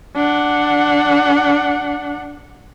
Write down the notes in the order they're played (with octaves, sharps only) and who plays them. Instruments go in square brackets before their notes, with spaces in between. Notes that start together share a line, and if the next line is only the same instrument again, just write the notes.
[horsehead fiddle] D4 F#5